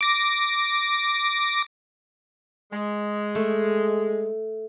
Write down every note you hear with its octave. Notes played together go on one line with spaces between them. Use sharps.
D6 A#6
G#3
A3